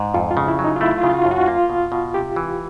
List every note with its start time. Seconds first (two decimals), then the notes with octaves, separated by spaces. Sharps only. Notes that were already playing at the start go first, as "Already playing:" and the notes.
Already playing: G#2
0.14 F2 F4
0.31 F4
0.37 C#3
0.48 E4
0.59 F#3
0.64 D#4
0.76 F4
0.81 A3 E4
0.97 F4
1.03 C#3
1.10 F4
1.14 F#4
1.25 F#2
1.31 F#4
1.47 A#3 F4
1.70 B2
1.92 B2
2.14 C3 G4
2.36 E3